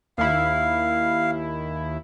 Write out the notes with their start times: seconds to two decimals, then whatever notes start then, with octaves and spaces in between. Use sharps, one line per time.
0.18 D#2 E4 F5